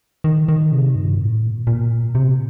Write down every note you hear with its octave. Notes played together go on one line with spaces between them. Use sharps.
D#3
D#3
C3
G2
A2
A#2
A#2
C3